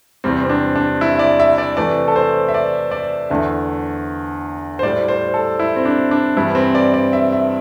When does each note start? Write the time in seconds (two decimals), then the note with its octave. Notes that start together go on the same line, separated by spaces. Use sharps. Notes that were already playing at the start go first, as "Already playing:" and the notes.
0.24 E2 C3 G3 C4
0.44 C4
0.50 D4
0.76 D4
1.01 E4
1.15 E5
1.19 D5
1.40 E5
1.58 D5
1.77 C3 E3 A3 D5
2.08 A4
2.16 C5
2.48 E5
2.54 D5
2.91 D5
3.30 E2 D3 A3 E5
4.79 C5
4.83 A2 G3 D5
5.08 C5
5.34 A4
5.60 E4
5.76 C4
5.85 D4
6.11 D4
6.36 G2 E3 G3 E4
6.55 C4
6.75 D5
6.94 D5
7.13 E5
7.32 E5